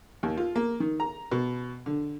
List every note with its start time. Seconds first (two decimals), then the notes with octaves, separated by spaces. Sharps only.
0.23 D#2
0.37 F4
0.56 A#3
0.80 D#3
1.00 A#5
1.32 B2
1.86 D3